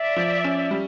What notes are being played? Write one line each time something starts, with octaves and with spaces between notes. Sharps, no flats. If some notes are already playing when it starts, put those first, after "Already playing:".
Already playing: D5 E5
F3
C#4
G3